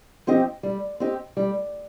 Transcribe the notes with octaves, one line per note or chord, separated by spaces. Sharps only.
F3 C4 G4 D#5
G3
C4 G4 D#5
G3